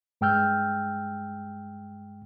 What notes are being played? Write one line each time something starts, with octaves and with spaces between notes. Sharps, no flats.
G2 G#3 G5 E6 F6 G6